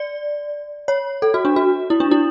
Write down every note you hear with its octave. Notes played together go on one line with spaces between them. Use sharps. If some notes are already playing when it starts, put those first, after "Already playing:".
Already playing: D5
C#5
A4
F#4
D4
F#4
E4
D4
E4